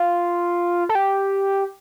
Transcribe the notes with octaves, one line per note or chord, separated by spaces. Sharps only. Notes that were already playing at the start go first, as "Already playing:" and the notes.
Already playing: F4
A4
G4